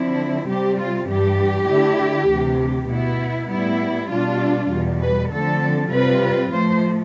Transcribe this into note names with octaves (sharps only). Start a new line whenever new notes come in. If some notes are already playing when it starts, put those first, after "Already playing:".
Already playing: D3 F3 C4 E4
C3 G3 C4 G4
F4
G2 E3 G3 G4
D3 A3 E4
D2 C3 E3
B2 B3 E4
A2 G3 B3 E4
B2 G3 D4 F4
E2 B2 G3
B4
D3 F3 A3 C4 A4
C3 G3 C4 F4 B4
A2 F3 A3 C5